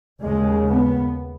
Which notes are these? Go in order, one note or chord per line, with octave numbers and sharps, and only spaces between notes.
D#2 C#3 G#3
B3